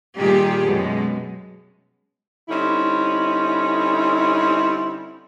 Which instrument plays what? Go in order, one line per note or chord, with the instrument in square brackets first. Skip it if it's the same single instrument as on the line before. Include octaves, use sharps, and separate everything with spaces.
[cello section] A#2 D#3 G3 G4 G#4
F#2 B2 G#3
[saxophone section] D3 G3 C4 C#4 D#4 E4